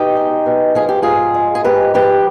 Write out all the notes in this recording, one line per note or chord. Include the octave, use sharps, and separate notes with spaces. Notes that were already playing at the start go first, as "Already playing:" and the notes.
Already playing: B2 D#4 G4
G#3
B2
F3 G#4
G4
G#2 F4 G#4
G#3
G#4
G#2 G4 B4
F3 G4 B4